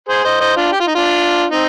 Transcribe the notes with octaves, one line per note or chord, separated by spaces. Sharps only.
G#4 C5
C5 D#5
C5 D#5
D4 F4
G4
F4
D#4
D4 F4
C4 D#4